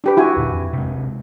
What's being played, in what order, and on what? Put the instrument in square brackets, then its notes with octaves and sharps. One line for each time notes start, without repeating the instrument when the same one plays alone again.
[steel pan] D4 G4 B4
E4 F#4 G#5
[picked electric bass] D#2 A#2 D3
F2
C3 G#3